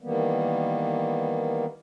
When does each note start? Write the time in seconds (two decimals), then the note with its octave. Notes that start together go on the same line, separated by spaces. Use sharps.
0.01 D#3 E3 G3 A#3 B3